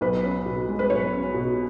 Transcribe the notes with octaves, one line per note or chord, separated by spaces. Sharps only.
B1 B4
C#4
B2
G#3
B4
B1 C#5
C#4
B2